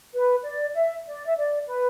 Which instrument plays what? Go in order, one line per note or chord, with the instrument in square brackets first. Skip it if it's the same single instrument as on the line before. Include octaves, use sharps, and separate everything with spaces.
[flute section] B4
D5
E5
D5
E5
D5
B4